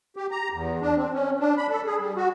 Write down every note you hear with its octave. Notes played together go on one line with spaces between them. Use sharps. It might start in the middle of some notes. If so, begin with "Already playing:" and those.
G4
A#5
E2
D4
C4
C#4
D4
B5
A4
G#4
G3
F#4